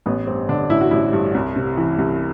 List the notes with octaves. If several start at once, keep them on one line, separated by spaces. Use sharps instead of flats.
A1 B3
G2 C4
D3 D4
A1 E4
F#4
A1 E4
G2
C2
C3
E3
C2